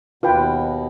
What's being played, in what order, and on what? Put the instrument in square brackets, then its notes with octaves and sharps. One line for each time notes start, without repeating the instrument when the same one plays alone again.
[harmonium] D#2 B2 [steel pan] F4 B4 G5